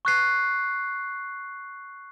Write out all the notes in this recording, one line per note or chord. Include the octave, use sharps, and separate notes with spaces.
C#6 F#6 C7